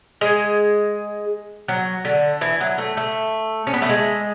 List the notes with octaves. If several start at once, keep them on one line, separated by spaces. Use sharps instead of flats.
G#3
F#3
D3
E3
F#3
A3
A3
C#4
B3
A3
G#3